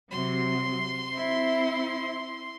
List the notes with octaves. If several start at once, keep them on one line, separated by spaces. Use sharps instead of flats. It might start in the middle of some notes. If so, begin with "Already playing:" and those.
C3 F#3 C6
C4 E4